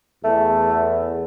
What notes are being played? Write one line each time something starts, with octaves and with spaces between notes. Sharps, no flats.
E2 A3